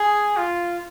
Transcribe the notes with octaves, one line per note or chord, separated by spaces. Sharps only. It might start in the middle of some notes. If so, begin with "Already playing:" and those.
Already playing: G#4
F4